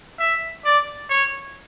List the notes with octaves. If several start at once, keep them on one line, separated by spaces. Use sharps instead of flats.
E5
D5
C#5